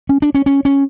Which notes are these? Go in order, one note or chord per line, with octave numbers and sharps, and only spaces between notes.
C#4
D4
C#4
C#4
C#4